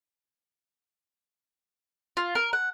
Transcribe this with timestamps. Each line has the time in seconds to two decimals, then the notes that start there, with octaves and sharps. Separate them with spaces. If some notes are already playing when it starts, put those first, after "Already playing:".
2.17 F4
2.35 A#4
2.53 F#5